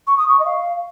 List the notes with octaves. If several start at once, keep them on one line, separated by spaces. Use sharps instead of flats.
C#6
D#6
C#6
D#5
F5